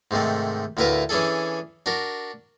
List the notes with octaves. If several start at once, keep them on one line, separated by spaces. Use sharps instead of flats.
G#2 C3 D#3 A3
D2 A2 E4 A#4 B4 F5
E3 C#4 D4 G#4 A4
D4 F#4 A#4